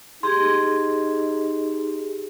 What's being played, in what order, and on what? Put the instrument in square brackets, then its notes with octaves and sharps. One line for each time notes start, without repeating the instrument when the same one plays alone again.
[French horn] D#4 [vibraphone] G4 G#4 [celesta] C6 G#6